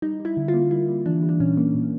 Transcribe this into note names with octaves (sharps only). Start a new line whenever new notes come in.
G3 D#4
G3
E4
D3
F4
A#3
G3 E4
G3
E3 D4
G3
D4
A#2 C#4
A#3
A#2